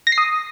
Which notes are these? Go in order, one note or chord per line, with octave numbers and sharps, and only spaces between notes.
A#6
C7
D#6